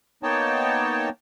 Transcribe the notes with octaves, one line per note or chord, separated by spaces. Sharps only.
A#3 B3 D#4 C#5 G5 A5